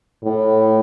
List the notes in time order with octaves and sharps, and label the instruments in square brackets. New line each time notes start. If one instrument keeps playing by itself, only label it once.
[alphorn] A2